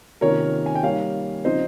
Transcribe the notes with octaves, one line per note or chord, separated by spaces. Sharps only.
C3 D#3 A#3 C#4 F4 A#4 C#5
G#5
G5
G3 A#3 D#4 C#5 F5
C#3 F3 C4 D#4 C5 D#5